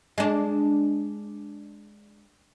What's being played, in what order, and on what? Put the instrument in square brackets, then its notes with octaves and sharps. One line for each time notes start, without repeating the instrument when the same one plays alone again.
[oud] G#3 D4